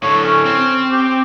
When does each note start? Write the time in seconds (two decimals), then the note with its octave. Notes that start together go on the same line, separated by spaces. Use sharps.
0.03 A2 D3 C#5
0.24 C#4
0.46 C4
0.91 G4